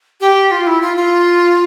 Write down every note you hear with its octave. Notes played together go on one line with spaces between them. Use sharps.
G4
F4
E4
F4
F4